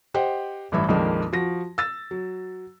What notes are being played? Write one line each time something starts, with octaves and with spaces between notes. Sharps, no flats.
G4 C5 D#5 F#5 G5
A1 G2 E3 E4 E5
A#1 F2 D#3 F3 G#3 A#3
F3 F#4 A#6
E6 A6
F#3